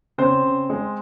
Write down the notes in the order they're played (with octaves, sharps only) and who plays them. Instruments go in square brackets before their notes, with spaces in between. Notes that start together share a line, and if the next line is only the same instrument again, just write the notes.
[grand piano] C#3 C4 C5
C#3
G#3